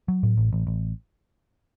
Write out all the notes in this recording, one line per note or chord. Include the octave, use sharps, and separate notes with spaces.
F#3
A2
A1
A1
A1